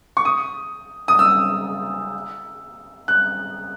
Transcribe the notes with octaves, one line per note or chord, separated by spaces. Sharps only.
C#6
D#6
D#6
E6
F#6